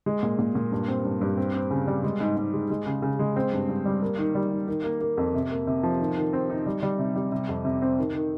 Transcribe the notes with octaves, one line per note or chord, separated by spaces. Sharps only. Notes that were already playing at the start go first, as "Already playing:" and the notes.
G#3
A#2
A#2
A#2
G2
C4
G2
G2
C4
C4
C#3
G3
G#3
G#2
G#2
G#3
G#3
C#3
C#3
G#3
C4
G2
G2
G3
A#3
D#3
G3
D#3
D#3
A#3
A#3
F2
C3
A#3
C3
F3
D#3
D#3
C4
D#4
G3
G3
C3
G3
C3
F2
C3
C4
D#3
D#3